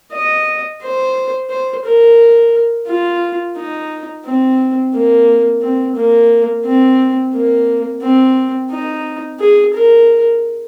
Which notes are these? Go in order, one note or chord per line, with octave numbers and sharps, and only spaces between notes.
D#5
C5
C5
A#4
F4
D#4
C4
A#3
C4
A#3
C4
A#3
C4
D#4
G#4
A#4